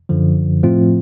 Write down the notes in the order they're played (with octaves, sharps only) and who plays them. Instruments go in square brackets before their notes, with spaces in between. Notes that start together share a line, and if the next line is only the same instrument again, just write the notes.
[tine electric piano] F#2 D3 F3
A2 F3 A3 C4 F4